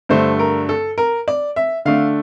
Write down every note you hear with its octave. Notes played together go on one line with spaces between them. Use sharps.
G2 D3 A3 C5
A#4
A4
A#4
D5
E5
D3 A3 D4 F5